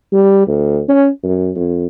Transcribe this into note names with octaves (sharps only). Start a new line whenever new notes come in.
G3
D2
C#4
F#2
F2